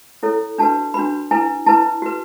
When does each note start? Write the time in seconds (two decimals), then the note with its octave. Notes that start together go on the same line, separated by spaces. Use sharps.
0.23 E4 A4 C#5
0.58 D4 F#4 B4 A5
0.94 D4 F#4 B4 B5
1.31 E4 B4 G#5
1.66 E4 B4 A5
2.02 F#4 B4